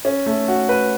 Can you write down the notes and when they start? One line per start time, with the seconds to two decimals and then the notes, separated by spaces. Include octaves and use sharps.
0.05 C#4
0.26 A3
0.48 F#4
0.69 B4